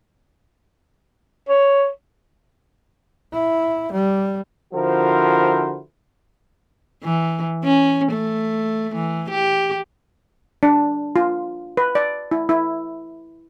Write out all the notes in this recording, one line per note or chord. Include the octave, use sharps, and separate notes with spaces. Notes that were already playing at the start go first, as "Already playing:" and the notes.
C#5
E4
G3
D3 F3 E4 F#4 A#4 C5
E3
C#4
A3
E3
G4
D4
F4
B4
D5
E4
E4